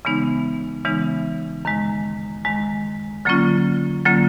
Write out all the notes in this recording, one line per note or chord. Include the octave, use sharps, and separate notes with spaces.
C#3 E3 G#3 B3 D#4
C#3 E3 G#3 B3 D#4
F#2 D#3 G#3
F#2 D#3 G#3
D3 F#3 A#3 C#4 F4
D3 F#3 A#3 C#4 F4